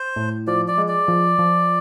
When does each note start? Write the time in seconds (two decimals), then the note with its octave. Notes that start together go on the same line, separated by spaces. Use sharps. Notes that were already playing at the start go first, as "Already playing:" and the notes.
Already playing: C5
0.16 A2
0.47 F3 D5
0.68 D5
0.78 G#3
0.88 D5
1.08 F3
1.39 F3